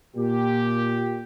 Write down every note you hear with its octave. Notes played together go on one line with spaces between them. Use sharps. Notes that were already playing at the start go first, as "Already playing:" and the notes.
A#2 G4